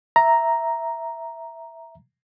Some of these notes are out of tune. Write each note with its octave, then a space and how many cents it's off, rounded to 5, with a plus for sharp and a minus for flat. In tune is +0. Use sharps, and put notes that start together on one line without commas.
E5 +0 A#5 +0